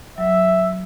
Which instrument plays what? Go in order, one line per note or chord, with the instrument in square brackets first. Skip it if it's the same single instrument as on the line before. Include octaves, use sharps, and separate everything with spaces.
[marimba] F#3 [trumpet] E5